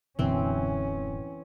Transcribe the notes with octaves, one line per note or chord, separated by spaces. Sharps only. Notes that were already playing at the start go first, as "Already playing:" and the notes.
D1 F#2 B2 D3 E3 C4 C#4